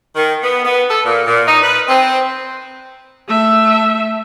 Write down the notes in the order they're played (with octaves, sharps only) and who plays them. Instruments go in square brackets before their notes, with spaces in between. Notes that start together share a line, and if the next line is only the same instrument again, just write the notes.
[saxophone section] D#3
B3
B3
A4
A#2
A#2
D#4
B4
C4
[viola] A3 E5